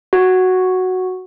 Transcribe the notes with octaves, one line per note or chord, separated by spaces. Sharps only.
F#4